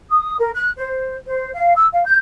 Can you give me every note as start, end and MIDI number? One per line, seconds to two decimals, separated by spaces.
0.10 0.35 87
0.38 0.51 70
0.54 0.70 90
0.77 1.16 72
1.26 1.50 72
1.54 1.73 77
1.76 1.87 88
1.92 2.04 77
2.06 2.17 91